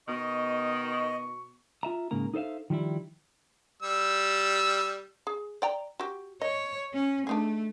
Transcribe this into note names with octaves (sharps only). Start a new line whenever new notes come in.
B2 D#3 D#5 C#6
F4 E5 A#5
G#2 C#3 A#3 A#5
D#4 A4 C5 E5 F5
D#3 F3 G3 E4
G3 E6
G#4
D5 G5 A#5
F#4 G4
C#5 D#5
C#4
A3 D4 D#4 G#4